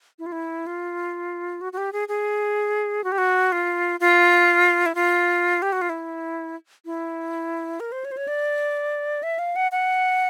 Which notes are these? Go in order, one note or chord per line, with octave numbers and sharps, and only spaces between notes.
E4
F4
E4
F4
F#4
F#4
G4
G#4
G#4
F#4
G4
F#4
F4
F4
E4
F4
G4
F#4
F4
E4
E4
A#4
C5
C#5
C5
C#5
D5
E5
F5
F#5
F#5